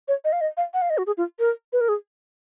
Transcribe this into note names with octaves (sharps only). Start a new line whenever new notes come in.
C#5
D#5
F5
D#5
F5
F#5
F5
D#5
F#4
G#4
F4
A#4
B4
A#4
G#4